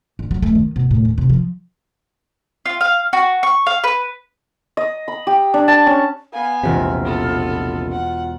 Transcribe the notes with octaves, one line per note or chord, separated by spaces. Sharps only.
D3
F#3
A3
D#3
B2
A2
D#2
C3
F3
F4
F5
F#4
C#6
F5
B4
D#5
B5
G4
D4
A5
C#4
B3 F5 G#5
E1 A#1 C3 F4 B6
B3 A4
F#5